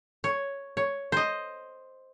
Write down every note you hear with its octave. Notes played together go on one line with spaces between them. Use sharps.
C#5
C#5
C5 D#5